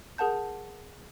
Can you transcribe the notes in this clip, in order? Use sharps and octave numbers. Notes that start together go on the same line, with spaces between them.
G#4 A#4 F#5 A5 G6